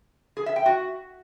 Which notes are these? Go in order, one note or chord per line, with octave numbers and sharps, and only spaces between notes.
G#4
E5
G5
F#4